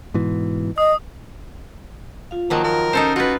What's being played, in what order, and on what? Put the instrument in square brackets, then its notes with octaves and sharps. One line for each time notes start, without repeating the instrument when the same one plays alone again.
[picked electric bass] G#2 B2 E3
[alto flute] D#5 [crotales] D#6
[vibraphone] F4 F5
[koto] D#3 F3 F#3 [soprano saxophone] A#3
[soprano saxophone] A#4
[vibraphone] C#4 [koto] D#4 A4 C5
[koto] F4 B4 [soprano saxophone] F#4